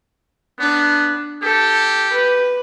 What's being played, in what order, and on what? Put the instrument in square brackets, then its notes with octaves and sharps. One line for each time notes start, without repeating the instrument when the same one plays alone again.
[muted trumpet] B3 [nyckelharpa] D4
[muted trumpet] G4 [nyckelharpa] A4
[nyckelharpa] B4